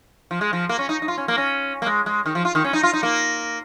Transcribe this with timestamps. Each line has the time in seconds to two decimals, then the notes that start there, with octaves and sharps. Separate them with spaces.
0.31 F3
0.41 G#3
0.53 F3
0.69 A#3
0.79 C#4
0.89 D#4
1.02 D#4
1.08 F4
1.18 C#4
1.28 A#3
1.38 C#4
1.82 A#3
1.86 G#3
2.06 G#3
2.26 D#3
2.35 F3
2.45 F4
2.55 D#3
2.64 C#4
2.73 D#4
2.83 F4
2.94 D#4
3.03 A#3